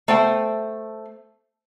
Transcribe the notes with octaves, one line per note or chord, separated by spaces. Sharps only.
A3 C5 G5